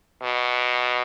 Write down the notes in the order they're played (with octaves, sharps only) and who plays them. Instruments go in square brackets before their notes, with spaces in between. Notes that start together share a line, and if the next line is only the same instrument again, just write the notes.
[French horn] B2